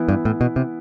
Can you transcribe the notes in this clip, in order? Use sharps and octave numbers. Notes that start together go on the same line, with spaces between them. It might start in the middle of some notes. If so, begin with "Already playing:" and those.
Already playing: E3 B3 E4
G2
A2
B2
C3